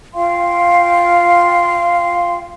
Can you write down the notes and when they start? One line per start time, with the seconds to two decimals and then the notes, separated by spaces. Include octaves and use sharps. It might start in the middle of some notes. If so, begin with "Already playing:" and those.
0.14 F4 F5 G5 C6